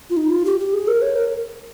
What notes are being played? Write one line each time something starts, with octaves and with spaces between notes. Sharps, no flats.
F4
D#4
F4
G4
G4
G#4
A#4
C#5
A#4